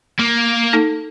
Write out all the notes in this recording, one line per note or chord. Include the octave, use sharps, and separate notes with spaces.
A#3
D#4 A4